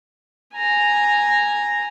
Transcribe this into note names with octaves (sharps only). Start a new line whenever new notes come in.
G#5 A#5